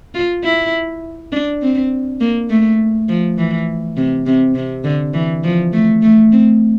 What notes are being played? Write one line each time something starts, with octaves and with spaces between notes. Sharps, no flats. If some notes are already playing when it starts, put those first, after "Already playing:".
F4
E4
D4
C4
A#3
A3
F3
E3
C3
C3
C3
D3
E3
F3
A3
A3
C4